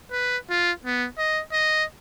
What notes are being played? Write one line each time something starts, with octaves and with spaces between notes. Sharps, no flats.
B4
F4
B3
D#5
D#5